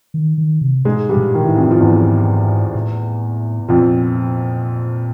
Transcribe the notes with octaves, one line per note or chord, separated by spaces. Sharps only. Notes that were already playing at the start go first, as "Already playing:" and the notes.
D#3
D#3
C3
G#2 B2 G#3
G2 G3
A#2
D#3
A2 E3
F2 F3
F3
E2 G#2 E3
A2
F2 A#2 F3